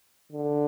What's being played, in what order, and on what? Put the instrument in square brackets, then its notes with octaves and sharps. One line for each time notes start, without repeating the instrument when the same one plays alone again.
[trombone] D3